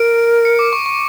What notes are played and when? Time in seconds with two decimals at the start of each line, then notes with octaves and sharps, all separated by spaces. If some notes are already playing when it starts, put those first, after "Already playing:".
Already playing: A#4 D7
0.45 C#7
0.59 D6
0.73 C#6
0.86 C#6